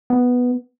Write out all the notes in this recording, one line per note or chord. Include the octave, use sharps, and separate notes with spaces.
B3